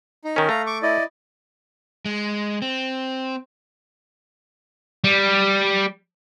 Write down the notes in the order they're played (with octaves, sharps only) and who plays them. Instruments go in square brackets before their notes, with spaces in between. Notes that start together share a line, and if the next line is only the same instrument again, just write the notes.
[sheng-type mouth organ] D#4
[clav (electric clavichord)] D#3 C#4 [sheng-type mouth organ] A#4
[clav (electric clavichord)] A3 [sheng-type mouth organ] F5 A#5
[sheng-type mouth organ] C#6 D6
E4 D5 D#5
[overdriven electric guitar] G#3
C4
[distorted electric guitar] G3